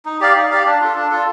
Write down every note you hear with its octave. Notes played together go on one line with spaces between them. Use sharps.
D#4
G4 D5 F5
D#4
G4 D5 F5
D4
F4 A4
D4
F4 A4